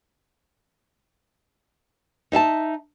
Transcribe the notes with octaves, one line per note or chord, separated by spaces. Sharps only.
D#4 E5 F5 A5